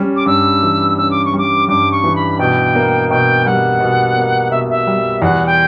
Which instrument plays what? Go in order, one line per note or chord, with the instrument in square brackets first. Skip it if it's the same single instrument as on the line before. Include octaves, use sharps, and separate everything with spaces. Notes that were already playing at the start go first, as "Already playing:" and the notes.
Already playing: [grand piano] G3 C#4
[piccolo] D6
[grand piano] G2 [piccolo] E6
[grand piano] E3
[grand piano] C#4 [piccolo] E6
[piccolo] D6
C#6
[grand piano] G3 [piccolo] D6
[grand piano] G2 [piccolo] D6
[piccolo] C#6
[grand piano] E3
[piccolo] B5
[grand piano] B2 [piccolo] G5
[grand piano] A#3
[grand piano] B2 [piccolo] G5
[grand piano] G3 [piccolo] F#5
[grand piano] B2
A#3
[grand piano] B2 [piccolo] E5
[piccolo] E5
[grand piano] G3
[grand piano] E2 [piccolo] F#5
[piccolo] G5